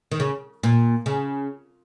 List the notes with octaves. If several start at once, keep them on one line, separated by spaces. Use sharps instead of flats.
D#3
C#3
A#2
C#3